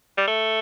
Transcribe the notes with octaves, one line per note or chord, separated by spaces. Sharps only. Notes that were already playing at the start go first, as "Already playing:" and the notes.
G3
A3